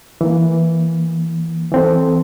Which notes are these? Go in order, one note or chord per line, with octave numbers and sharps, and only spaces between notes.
E3 A#3
E3 C4 A4